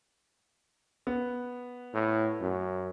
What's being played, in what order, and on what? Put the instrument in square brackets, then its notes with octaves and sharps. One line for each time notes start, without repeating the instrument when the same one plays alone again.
[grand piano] B3
[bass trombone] A2
F#2